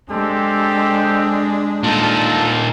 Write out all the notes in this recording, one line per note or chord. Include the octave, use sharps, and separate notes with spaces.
G#3 C4 D4 G4 A4
A#2 D#4 F4 A4 A5